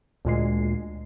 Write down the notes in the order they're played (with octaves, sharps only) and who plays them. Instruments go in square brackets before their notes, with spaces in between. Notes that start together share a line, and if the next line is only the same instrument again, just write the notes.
[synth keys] D2 A#2 G#3 C7